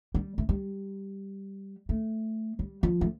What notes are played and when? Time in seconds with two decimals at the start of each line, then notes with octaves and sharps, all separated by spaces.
0.14 G3
0.38 A3
0.49 G3
1.89 A3
2.59 G3
2.83 F3
3.01 A3